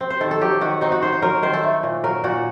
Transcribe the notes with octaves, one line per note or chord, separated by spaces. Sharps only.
C4
C5
D#3 A4
A4
F#3 G4
D#3 F#4
C4 D#4
F#4
D#3 C5
C5
F#3 A#4
D#3 C5
A4
A3
A#2
F#3 A#4
A#2 F#4